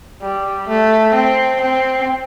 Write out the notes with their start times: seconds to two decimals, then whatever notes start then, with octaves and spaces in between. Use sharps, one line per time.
0.22 G3
0.68 A3
1.14 C4
1.61 C4